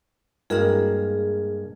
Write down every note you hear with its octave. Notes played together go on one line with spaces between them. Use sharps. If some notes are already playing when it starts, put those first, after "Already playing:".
G2 G#3 A#3 E4 F#4 G#4 A#4